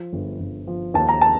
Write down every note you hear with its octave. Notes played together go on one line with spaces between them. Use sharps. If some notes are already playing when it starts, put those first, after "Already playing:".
Already playing: F3
G1
G1
F3
D#2 A5
A#5
A5